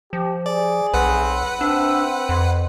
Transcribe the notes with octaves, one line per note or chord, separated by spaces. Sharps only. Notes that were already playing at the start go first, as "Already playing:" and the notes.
F3 G4
G#4 D5
B1 C4 B4 F#5
C4 D4 E5
F2 C5